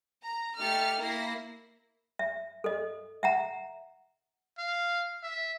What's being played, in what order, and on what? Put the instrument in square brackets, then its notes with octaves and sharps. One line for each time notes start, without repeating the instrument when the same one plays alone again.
[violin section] A#5
A3 D#4 G4 F6 A6 C#7
A#3 E4 A#6 C7
[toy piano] E5
A4 D#5
E5 F#5 A#5
[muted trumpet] F5
E5